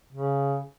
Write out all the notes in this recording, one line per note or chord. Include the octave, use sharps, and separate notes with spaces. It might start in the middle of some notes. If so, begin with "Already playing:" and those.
C#3